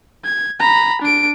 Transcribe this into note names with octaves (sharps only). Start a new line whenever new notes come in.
G#6
A#5 B5
D4 D7